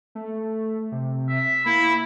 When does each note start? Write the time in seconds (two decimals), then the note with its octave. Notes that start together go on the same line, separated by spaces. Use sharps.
0.15 A3
0.92 C3
1.29 E5
1.66 A#3 E4